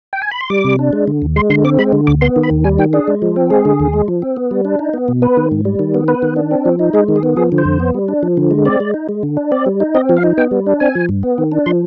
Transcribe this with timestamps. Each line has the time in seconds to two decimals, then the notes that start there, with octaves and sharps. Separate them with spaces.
0.13 G5
0.22 G#5
0.31 B5
0.41 C6
0.50 G3 D6
0.64 C3
0.79 D4
0.93 G#3
1.08 D3
1.22 D#2
1.36 G#3 C6
1.50 D3 C6
1.64 C4 D6
1.79 G#3 B5
1.93 D3
2.07 D2 D6
2.21 B3 C6
2.36 D#3
2.43 B5
2.51 D#2
2.64 G3 G#5
2.79 D#3 G5
2.93 D4 G#4
3.08 G#3
3.22 F3
3.36 C4
3.50 G#3 G#4
3.65 D3
3.80 D#2
3.93 G#3
4.08 F3
4.22 C4
4.37 B3
4.51 G3
4.65 D4
4.79 D#4
4.94 B3
5.08 B2
5.22 B3 B4
5.37 D#3
5.51 G#2
5.65 G3
5.79 D#3
5.94 B3
6.08 B3 B4
6.22 D#3
6.36 D4
6.51 C4
6.65 F3
6.79 D#4
6.93 G#3 G#4
7.08 D#3
7.16 G#4
7.23 B3
7.37 F3 G#4
7.52 D3
7.58 C5
7.65 F2
7.80 B3
7.94 G3
8.08 D4
8.23 F3
8.37 D3
8.51 G#3
8.65 C4 D5
8.80 G#3
8.94 D#4
9.09 G#3
9.23 D3
9.37 D4
9.52 C4 D5
9.66 G3
9.80 D#4
9.95 C4 D#5
10.09 F3
10.17 F5
10.24 D#4
10.38 B3 G5
10.51 G3
10.66 D4
10.80 C4 G#5
10.95 F3
11.09 G2
11.23 B3
11.38 D#3
11.52 D4
11.66 F3 C6